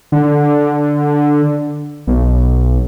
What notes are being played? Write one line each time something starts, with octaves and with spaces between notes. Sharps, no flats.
D3
B1